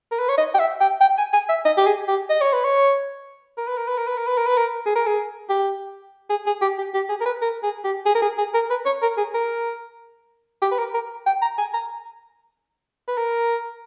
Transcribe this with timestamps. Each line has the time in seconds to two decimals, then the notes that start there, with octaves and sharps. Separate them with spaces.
0.12 A#4
0.20 B4
0.29 C#5
0.38 D#5
0.55 G5
0.59 E5
0.81 G5
1.01 G5
1.18 G#5
1.33 G#5
1.49 E5
1.65 D#5
1.77 G4
1.87 G#4
2.08 G4
2.30 D#5
2.41 C#5
2.53 B4
2.64 C#5
3.58 A#4
3.68 B4
3.78 A#4
3.88 B4
3.98 A#4
4.08 B4
4.18 A#4
4.27 B4
4.38 A#4
4.47 B4
4.58 A#4
4.86 G#4
4.96 A#4
5.07 G#4
5.49 G4
6.30 G#4
6.47 G#4
6.62 G4
6.78 G4
6.94 G4
7.09 G#4
7.21 A#4
7.26 B4
7.42 A#4
7.63 G#4
7.84 G4
8.06 G#4
8.15 A#4
8.22 G#4
8.38 G#4
8.54 A#4
8.70 B4
8.86 C#5
9.02 A#4
9.18 G#4
9.35 A#4
10.62 G4
10.71 B4
10.79 A#4
10.95 A#4
11.27 G5
11.42 A#5
11.58 G#5
11.74 A#5
13.08 B4
13.18 A#4